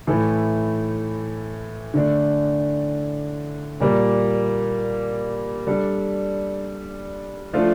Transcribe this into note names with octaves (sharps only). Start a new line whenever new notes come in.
A2 E3 A3 E4
D3 A3 D4
A#2 G3 A#3
G3 D4 A4
F3 A3 D4 F4 A4